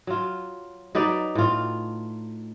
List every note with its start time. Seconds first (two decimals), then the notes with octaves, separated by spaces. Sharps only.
0.07 F#3 F4
0.95 F#3 D#4 B4 D5
1.35 A2 F4